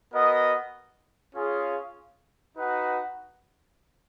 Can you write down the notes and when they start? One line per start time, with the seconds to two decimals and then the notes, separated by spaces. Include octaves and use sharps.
0.12 B3 F#4 A#4 D#5
1.35 C#4 F4 G#4 C#5 F5
2.57 D#4 F#4 B4 F#5